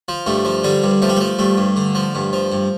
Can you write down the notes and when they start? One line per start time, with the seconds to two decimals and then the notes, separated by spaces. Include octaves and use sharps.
0.08 F3
0.26 G2 A3
0.45 F3
0.64 D3 G3
0.84 G2
1.02 F3 A3
1.09 G3
1.17 F3 A3
1.39 G2 A3
1.57 G2
1.76 D3
1.95 F3
2.15 G2
2.33 F3
2.52 G2